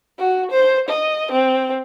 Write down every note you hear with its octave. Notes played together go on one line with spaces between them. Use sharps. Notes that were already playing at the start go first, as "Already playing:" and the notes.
F#4
C5
D#5
C4